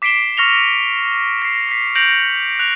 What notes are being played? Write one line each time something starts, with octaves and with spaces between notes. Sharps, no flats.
D6 B6 C7 D7 E7 G7
C#6 F6 A#6 C#7 F7 G7
A#6 C7
B6 C7
G6 A#6 C#7 D7 F7 F#7
F#6 F7